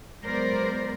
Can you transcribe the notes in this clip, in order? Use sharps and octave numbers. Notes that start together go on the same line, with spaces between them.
F#3 G#3 B3 A#4 C5 D5